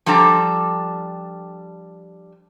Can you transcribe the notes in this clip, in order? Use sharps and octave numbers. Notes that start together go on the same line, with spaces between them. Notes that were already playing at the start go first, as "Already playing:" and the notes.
F3 G3 D4 A4 A#5